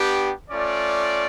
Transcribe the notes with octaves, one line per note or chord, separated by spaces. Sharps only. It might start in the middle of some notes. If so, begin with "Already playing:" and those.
Already playing: B3 D4 G4
A3 C#4 F4 D5